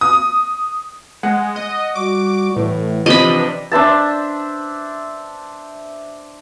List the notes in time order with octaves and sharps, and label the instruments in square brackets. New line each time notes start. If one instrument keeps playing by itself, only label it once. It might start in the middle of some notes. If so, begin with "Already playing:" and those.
[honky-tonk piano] D#6
[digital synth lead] G#3 [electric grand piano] F#5
[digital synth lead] D#5
[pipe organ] G3 F#4 [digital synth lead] D6
[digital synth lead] A2 [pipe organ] E3
[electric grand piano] C3 F3 [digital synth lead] D4 [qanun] D#5 B5
[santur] D4 C5 E5 A5